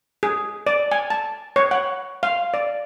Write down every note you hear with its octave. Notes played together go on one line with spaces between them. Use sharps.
G#4
D5
G#5
A5
C#5
F#5
F5
D5